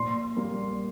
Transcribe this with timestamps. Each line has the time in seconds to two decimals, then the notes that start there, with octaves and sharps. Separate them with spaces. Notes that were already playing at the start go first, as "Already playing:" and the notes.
Already playing: A#2 C6
0.36 G3 A#3